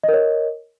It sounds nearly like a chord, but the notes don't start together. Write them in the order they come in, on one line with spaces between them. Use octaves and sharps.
D#5 A#4 C#5